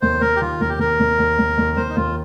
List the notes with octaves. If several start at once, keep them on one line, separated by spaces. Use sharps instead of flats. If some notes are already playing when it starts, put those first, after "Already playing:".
D#2 C5
D#2 A#4
G4
D#3 F4
D#2 A#4
G4
D#2 A#4
D#2
D#2
D#2
D#2
D#2 C5
D#4
D#2 F4